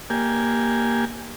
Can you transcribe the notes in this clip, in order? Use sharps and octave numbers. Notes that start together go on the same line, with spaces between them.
A#3 G4 G#5